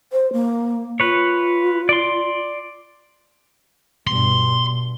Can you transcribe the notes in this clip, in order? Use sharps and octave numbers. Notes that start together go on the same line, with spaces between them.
C5
A#3
F4 B4 C#5
D5 C6
G2 B2 C6